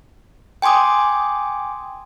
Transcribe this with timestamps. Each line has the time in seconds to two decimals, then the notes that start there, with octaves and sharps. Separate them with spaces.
0.62 G5 G#5 C6 D6 D#6